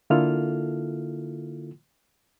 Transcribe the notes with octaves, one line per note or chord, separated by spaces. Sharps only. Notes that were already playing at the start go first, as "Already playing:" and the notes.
D3 A#3 E4 F4 A4 F6